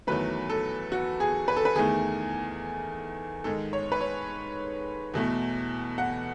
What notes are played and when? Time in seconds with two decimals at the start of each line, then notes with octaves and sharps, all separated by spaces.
0.07 E2 D#3 F#3 A3 B4
0.50 A4
0.92 F#4
1.20 G#4
1.48 B4
1.56 A4
1.65 B4
1.76 E2 D#3 A3 G#4
3.44 G#2 D#3 G#3 A4
3.73 C#5
3.92 B4
4.01 C#5
5.14 E2 B2 A3
5.98 F#5